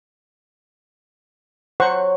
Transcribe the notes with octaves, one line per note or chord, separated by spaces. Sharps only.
F#3 C5 F#5 C#6